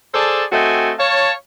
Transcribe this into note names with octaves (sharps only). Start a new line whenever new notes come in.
G#4 A4 C5 D5 A5
A3 C4 F#4 D#5 G5 G#5
C#5 F5 A5